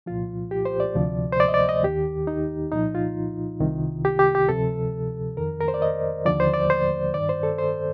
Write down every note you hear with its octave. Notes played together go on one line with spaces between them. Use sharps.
C2 A#2 F3 F4
G4
C5
D5
D2 C3 F3
C5
D5
D#5
D5
D#5
D#2 D#3 G4
D#4
C2 A#2 F3 D#4
F4
C2 C3 D#3
G4
G4
G4
D2 C3 F3 A4
F2 D#3 A#4
A#4
C5
D5
D#5
D#2 D3 F3 D5
C5
D5
C5
G2 D#3 D5
C5
A4
C5